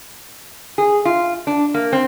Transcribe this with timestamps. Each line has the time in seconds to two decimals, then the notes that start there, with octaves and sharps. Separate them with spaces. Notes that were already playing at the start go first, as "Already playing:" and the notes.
0.78 G#4
1.05 F4
1.47 D4
1.74 A#3
1.93 C4